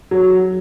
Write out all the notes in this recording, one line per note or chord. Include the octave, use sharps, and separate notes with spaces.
F#3